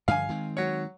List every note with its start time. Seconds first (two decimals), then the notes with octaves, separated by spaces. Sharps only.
0.08 G2 D3 F3 F5 G#5
0.29 D#3 G#3 C4
0.57 F#3 C#5